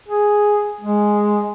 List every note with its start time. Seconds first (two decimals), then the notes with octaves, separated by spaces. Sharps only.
0.08 G#4
0.81 G#3